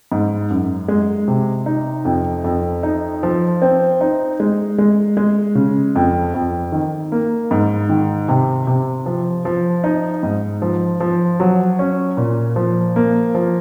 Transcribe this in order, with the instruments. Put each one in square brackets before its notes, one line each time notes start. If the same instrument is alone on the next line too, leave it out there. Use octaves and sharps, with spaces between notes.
[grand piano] G#2
F#2
G#3
C3
D#4
F2
F2
D#4
F3
C4
D#4
G#3
G#3
G#3
C#3
F2
F2
D#3
A#3
G#2
D#3
C3
C3
F3
F3
D#4
G#2
F3
F3
F#3
C#4
A#2
F3
A#3
F3